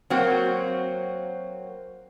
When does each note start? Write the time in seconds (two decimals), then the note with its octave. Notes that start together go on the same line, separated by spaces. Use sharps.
0.10 F#3 A#3 C4 F#4